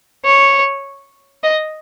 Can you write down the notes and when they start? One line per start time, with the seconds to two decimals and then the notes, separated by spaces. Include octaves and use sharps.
0.25 C#5
1.43 D#5